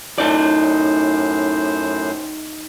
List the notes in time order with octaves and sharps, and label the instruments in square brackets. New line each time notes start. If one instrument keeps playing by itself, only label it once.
[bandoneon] F#2 A2 C5 [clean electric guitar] D#4 D5